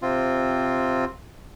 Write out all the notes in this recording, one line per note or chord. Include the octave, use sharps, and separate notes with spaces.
C3 C4 F4